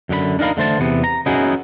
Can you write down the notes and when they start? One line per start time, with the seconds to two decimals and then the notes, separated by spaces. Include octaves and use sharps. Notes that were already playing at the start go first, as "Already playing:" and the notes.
0.09 F#2 D3 G4 B5
0.39 D4 D#4 A#4 F5 B5
0.57 D3 A3 C5 A5
0.80 E2 C3 B3
1.04 A#5
1.26 B3 C#4 D#4 E4 F#4 G#4